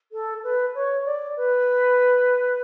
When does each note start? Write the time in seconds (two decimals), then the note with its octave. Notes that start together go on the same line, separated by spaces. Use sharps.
0.12 A4
0.44 B4
0.75 C#5
1.06 D5
1.37 B4